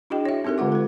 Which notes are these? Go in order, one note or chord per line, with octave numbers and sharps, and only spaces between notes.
D4 E4 F#4 G#4 D#5 G5
C#5 E5
C4 D#4 G4 A4 A#4
D3 G#3 F4 F#5 D6
A4 B4